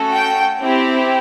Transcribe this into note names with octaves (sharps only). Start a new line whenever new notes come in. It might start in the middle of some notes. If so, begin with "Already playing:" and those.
Already playing: A3 C#4 F#4 A4
G5
C4 E4 G4